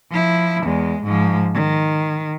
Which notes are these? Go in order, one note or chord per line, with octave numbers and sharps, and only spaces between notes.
F3 E4
E2 G#3
G#2 F3
D#3